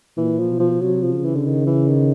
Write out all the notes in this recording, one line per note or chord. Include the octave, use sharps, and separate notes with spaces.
A#2 E3
F3
B2
F3
C3 F#3
F3
C#3
E3
D3
D#3
E3
D#3